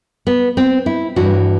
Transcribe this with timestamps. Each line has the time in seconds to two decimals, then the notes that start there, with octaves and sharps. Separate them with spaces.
0.27 B3
0.57 C4
0.86 E4
1.16 G2 E3 F#4